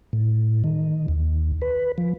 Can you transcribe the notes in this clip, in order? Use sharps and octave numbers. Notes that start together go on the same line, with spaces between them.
A2
D#3
D#2
B4
F3